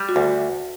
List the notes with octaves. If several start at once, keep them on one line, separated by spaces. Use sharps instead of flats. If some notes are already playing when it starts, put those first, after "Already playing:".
Already playing: G3
F#4
D2